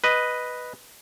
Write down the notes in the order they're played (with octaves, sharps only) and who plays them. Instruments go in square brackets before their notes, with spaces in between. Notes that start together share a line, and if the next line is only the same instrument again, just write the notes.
[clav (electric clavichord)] B4 D#5